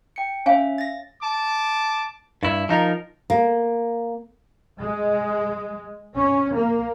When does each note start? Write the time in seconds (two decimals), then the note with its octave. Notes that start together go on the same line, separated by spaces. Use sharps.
0.16 G5 C#7
0.46 C#4 C#5 E5 F5 G#5
0.78 A6 A#6
1.22 A5 D6
2.43 G2 E4
2.69 F3 D#4 F4 A#4
3.30 A#3
4.79 G#3
6.16 C#4
6.54 A#3